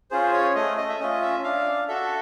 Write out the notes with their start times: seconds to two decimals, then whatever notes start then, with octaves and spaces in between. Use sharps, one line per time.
0.11 C#4 F4 G#4 C5
0.33 C#5
0.55 A3 D#5
0.77 D#5
0.89 E5
1.00 C#4 F4 D#5
1.21 E5
1.44 D4 F5
1.88 F#4 A4 E5